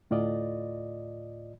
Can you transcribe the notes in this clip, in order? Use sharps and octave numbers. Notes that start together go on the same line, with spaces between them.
D2 A2 F4 D5 D#5